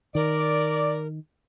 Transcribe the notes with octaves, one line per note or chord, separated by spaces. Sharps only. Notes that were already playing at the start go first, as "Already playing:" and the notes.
D#3 A#4 D5